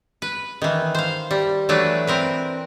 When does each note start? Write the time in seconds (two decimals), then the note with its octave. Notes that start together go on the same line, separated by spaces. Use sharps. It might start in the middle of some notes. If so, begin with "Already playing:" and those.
0.22 B4
0.62 D#3 E3
0.95 C5 F5
1.31 G3
1.69 E3 F#3 A3 D4 B4
2.07 C4 A#4 B4